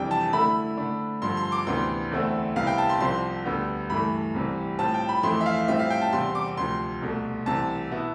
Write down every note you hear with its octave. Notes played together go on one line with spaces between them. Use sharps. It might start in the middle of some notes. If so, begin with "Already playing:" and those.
Already playing: F2 C3 E3 G3 D4 G5
A5
D3 A3 E4 B5
D3 A3 D4
G2 D3 F3 C6
C6
D6
D2 C3 E3 B3 D4 C6
E2 D3 A3 C4 E4
C2 C3 G3 B3 E4 F5
G5
A5
C6
C2 C3 F3 C4 C6
D2 D3 G3 B3
G2 E3 A3 B5
C2 C3 E3 G3
A2 G3 C4 F4 A5
G5
B5
F2 E3 A3 E4 C6
E5
F5
A2 G3 C4 F4 E5
F5
G5
A5
E2 C3 G3 C6
D6
D2 C3 F3 C6
C2 B2 A3
C2 C3 E3 A5
B2 B3 E4